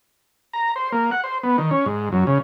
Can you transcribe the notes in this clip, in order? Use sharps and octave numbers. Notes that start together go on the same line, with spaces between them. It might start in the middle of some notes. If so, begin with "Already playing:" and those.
A#5
C5
A#3
F#5
C5
B3
D#3
C#4
G#2
F#2
C#3